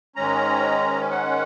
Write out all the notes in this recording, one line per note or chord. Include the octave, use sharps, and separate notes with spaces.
G#2 D#3 G#3 C#4 A#5
F#5